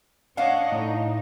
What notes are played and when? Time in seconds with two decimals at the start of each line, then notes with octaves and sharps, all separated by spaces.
0.37 C#4 D4 C#5 D#5 F5 F#5
0.72 A2 D#4